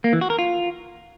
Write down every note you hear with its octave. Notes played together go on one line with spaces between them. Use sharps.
A#3
E3
F#4
A#4
F4